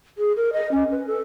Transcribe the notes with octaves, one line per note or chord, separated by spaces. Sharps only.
G#4
A#4
D#5
C#4
B4
A4